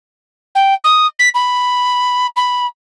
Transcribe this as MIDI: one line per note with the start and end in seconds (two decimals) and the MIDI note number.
0.55 0.74 79
0.84 1.06 87
1.19 1.29 95
1.34 2.27 83
2.36 2.66 83